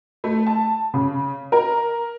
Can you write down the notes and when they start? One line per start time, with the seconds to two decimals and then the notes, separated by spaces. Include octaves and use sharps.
0.24 A3
0.46 A5
0.94 C#3
1.52 A#4